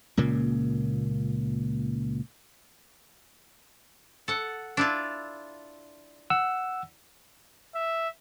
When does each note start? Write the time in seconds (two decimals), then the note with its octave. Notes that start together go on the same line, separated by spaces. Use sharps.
0.17 C#2 A#2 C#3 A#3
4.28 A4 F#5
4.77 D4 E4 F4
6.30 F#5 E6
7.75 E5